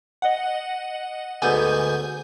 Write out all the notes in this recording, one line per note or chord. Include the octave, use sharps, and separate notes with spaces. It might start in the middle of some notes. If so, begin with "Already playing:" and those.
D#5 F#5
D2 G#2 B3 G#5 G6